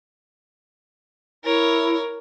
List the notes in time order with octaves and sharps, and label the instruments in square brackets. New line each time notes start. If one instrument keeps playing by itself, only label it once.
[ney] E4 [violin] A#4 C#5